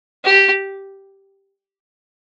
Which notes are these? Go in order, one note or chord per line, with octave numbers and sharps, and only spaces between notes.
G4